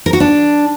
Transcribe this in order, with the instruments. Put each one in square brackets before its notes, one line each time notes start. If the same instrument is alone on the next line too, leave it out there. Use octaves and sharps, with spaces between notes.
[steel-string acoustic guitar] A#4
F#4
D4